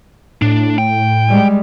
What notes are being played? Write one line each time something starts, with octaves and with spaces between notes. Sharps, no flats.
A2 D4
G5
G3 G#3